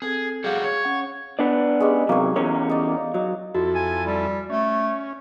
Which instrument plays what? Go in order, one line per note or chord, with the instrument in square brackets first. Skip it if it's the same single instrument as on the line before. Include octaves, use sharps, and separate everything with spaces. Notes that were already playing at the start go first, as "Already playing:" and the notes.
[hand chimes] C4 A4 [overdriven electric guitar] G#4
[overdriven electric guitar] G3 F#4 [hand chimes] G#4 F5
[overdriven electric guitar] C#5
[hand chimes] C#4 F#5
[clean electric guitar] B3 D4 D5
[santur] G#3 C#4 G4
[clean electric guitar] C3 F#3 [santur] A#3 C#5
[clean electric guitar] E2 C#4 C#5 [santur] A#4
[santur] D#4 D5
[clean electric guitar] F#3 [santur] D#4
[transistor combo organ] F2 E4 A4 [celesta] F#4
[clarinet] G#5
G3
[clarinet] A3 [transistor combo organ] C#4